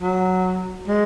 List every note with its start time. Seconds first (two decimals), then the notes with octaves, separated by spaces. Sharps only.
0.01 F#3
0.88 G#3